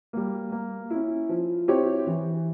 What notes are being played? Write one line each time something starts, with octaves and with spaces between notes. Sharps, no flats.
G3 A#3
A#3
C#4 E4
F3
C4 E4 G4 C#5
E3